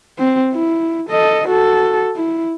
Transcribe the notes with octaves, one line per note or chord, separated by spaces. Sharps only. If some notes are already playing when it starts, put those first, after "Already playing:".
C4
E4
A4 D#5
F#4 A4
E4